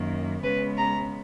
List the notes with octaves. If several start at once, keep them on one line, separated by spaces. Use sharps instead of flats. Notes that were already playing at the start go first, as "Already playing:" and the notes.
Already playing: F#2 D#3 A#3
C#3 G#3 B3 B4
A#5